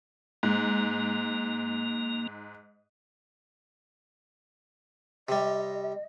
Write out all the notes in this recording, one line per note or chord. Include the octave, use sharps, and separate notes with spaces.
G#2 A#3
C3 G3 D#5